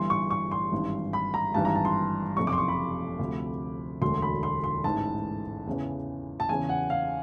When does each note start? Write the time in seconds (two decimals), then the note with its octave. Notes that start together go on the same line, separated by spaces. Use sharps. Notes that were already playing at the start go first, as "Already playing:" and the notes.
Already playing: G1 G2 E3 C6
0.10 C#6
0.31 C#6
0.51 C6
0.72 G#1 G2 E3
1.13 B5
1.34 A#5
1.54 G#1 G2 E3 A5
1.65 A#5
1.75 A5
1.85 C6
2.37 F#1 F2 C3 C#6
2.47 D6
2.53 C6
2.58 C#6
2.68 B5
3.19 D2 C3 F3
4.02 E1 D2 D3 F#3 C6
4.22 B5
4.43 C6
4.64 C6
4.84 A1 G#2 E3 A5
5.67 E2 C#3 E3
6.40 A5
6.49 E2 C#3 E3 G#5
6.69 F#5
6.90 F5